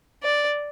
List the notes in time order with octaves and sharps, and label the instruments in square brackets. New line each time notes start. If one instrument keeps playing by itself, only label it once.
[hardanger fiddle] D5